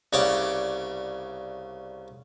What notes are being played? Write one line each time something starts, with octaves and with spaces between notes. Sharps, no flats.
C2 C#3 C#5 D5 C#6 D6